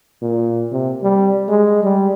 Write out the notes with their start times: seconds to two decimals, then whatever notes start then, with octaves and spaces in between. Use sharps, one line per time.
0.22 A#2
0.72 C3
1.03 G3
1.49 G#3
1.83 G3